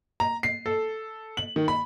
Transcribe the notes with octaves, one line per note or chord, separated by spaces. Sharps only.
A#5
C7
A4
F#7
D#3
B5